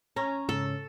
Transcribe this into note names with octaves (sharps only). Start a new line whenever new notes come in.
C#4 A#5
G#2 C#3 A4